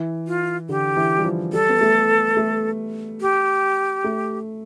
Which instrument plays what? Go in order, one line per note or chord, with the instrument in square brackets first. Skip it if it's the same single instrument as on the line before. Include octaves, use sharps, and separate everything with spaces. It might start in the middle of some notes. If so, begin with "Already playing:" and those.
Already playing: [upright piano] E3
[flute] F4
[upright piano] D3 [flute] G4
[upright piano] E3
G3
F3
[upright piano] G3 [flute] A4
[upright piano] B3
A3
A3
[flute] G4
[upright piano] A3